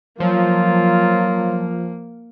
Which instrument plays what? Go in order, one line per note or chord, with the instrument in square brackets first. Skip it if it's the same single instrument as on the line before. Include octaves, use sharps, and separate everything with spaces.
[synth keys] F3 [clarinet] F#3 [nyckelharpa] A#3 [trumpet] F4